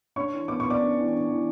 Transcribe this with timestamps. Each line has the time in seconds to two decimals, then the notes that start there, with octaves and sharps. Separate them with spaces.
0.16 D4 C#5 C#6
0.33 E3
0.48 B3 D6
0.60 C#6
0.65 B3 D5 D6
0.81 D4
0.97 E3
1.14 D4
1.29 E3